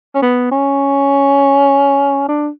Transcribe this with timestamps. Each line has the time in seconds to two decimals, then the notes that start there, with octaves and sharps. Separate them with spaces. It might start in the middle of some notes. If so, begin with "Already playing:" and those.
0.15 C#4
0.22 B3
0.51 C#4
2.28 D4